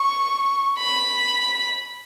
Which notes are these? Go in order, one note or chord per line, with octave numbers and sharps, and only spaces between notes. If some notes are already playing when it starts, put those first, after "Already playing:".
Already playing: C#6
B5